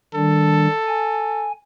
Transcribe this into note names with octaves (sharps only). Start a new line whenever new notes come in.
D#3 G3 D4 A4
G#5